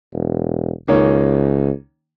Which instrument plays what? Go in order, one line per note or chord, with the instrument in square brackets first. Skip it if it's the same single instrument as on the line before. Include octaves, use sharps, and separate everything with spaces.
[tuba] E1
[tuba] C#2 [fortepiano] D#3 A#3 C#4